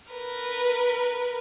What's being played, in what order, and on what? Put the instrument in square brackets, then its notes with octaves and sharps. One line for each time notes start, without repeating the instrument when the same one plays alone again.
[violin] A#4 B4